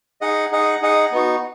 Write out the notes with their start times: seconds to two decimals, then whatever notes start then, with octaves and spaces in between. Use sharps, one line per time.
0.21 D#4 G#4 D#5 F#5
0.52 D#4 G#4 D#5 F#5
0.82 D#4 G#4 D#5 F#5
1.12 B3 D#4 F#4